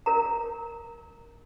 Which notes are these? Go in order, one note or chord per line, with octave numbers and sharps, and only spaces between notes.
A#4 A#5